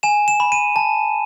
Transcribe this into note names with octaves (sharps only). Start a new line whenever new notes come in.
G#5 E7
E7
B5
D#7
A5